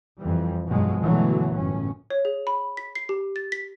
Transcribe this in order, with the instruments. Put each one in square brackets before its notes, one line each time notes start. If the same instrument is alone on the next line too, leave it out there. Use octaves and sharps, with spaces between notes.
[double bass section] F2 E3 G3
B1 G2 B2 F3 F#3 G#3
G2 B2 D3 E3 F#3 A3
G1 F#2 A2 C#4
[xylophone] C#5
G#4
B5
B6
C7
G4
A6
B6